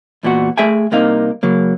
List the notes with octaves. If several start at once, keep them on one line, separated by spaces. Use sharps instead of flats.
E2 A#2 B3 F#4
A3 G#4 E5 G5 G#5
C2 C3 A#3 D#4 F5
C#3 F#3 A#3